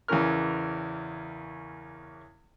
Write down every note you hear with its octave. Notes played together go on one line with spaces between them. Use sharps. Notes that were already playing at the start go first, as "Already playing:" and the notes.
E2 C#3 E3 C#4 A#4 F6